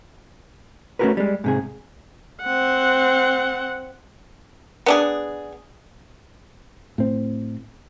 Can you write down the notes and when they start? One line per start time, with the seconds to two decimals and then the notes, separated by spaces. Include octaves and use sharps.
0.99 A3 C#4 F4 F#4 A#4 B4
1.17 G3 G#3
1.44 G#2 C3 G#4
2.44 C4 F#5
4.86 B3 D4 G#4
6.98 A2 C4